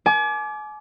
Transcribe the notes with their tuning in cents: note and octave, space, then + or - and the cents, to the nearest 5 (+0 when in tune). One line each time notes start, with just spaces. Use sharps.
G#5 +40 D6 +0